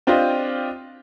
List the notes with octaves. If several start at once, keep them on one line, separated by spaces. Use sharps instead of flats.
C4 D4 F4 G4 C5 D#5